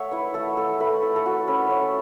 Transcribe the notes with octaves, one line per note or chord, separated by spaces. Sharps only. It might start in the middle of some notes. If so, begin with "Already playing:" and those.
Already playing: A3 C#5 E5 F#5
E4 B4
A3 A4
A3 A4
A3 B4
E4 A4
A4
E4 F#4
C#4 B4
A3 C#5